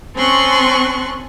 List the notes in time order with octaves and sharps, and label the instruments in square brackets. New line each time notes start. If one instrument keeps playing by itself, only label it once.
[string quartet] C4 C#4 A5 C6 C#6 F#6